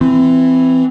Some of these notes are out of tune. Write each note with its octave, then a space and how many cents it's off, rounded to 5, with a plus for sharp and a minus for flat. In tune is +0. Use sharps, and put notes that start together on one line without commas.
E3 +10 C4 -20